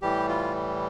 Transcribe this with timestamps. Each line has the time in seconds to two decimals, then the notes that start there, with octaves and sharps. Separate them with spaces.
0.02 A2 E3 G3 G4
0.28 F4